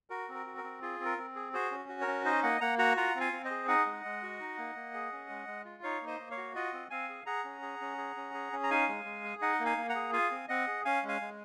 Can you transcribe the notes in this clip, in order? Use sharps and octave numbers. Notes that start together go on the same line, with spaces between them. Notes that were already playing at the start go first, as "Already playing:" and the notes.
F#4 A#4
C4
A#4
F#4
A#4
C4
F4 G#4
C4
A#4
C4
G#4
F#4 G#4 C5
C#4
F#4
A#4 C#5
C#4
D#4 C5 D#5
A#3 D#5 F#5
A#3 F#5 A#5
F#4 F#5 A#5
F4 F#5 A#5
C4
F5 G#5
C4
C5 D#5
G#4
D#4 D#5 F#5
G#3
G#3
F#4
D#4
A#3
A#3
G#4
C#4
G#3
G#3
F4
D#4 C#5 F5
A#3
C5 D#5
A#3
C#5 F5
F#4
F4 D#5 F#5
C4
C4 F5 G#5
G#4
G#4 F#5 A#5
C#4
G#4
C#4
G#4
C#4
G#4
C#4
A#5
D#4 F5 G#5
G#3
G#3
G#4
D#4 D#5 F#5
A#3
F5 G#5
A#3
F#5 A#5
G#4
F4 F5 G#5
C4
C4 D#5 F#5
G#4
C#4 F5 G#5
G#3
F5 G#5
G#3